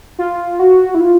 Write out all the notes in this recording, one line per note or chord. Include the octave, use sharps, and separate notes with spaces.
F4
F#4
E4
F4